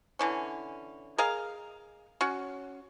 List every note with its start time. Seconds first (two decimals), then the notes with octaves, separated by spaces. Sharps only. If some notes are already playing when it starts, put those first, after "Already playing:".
0.19 D3 E3 C#4
1.18 G#4 A#4 D#5 F5
2.21 C#4 F#4